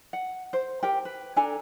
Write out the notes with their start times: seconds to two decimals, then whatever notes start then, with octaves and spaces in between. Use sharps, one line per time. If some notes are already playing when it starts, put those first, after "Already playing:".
0.13 F#5
0.53 C5
0.83 G4 A#4 G5
1.05 B4
1.36 D4 A4 G#5 A#5